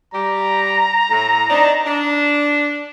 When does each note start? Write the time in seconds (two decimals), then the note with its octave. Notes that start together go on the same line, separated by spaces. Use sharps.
0.14 G3 G4 A#5
1.11 A2
1.50 C4 D4 D#4
1.86 D4